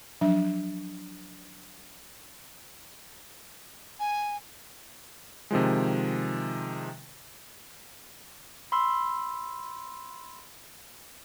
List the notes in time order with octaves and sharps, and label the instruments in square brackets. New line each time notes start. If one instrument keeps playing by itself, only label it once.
[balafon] F3 F#3 D4 E5
[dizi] G#5
[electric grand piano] C3 D#3 F3 G#3
[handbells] B5 C6 E6